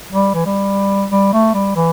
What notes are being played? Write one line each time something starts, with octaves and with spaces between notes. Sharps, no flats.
G3
E3
G3
G3
A3
G3
E3